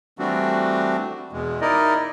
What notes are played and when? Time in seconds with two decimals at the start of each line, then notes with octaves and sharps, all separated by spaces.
0.19 E3 G3 A3 C4 D4 F#4
1.33 E2 B2 G#3
1.61 D#4 E4 A#4 D5 D#5